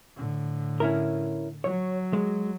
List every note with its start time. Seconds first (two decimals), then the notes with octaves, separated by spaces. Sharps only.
0.17 A2 D3
0.80 C#4 E4 A#4
1.64 F#3 C#5
2.13 G#3